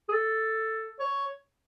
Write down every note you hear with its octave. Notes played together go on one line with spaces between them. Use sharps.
G#4
A4
C#5